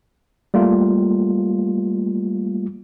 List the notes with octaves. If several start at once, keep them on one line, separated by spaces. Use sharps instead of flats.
G3 A3 A#3 F4